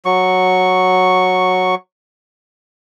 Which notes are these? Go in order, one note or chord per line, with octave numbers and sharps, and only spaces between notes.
F#3 C#6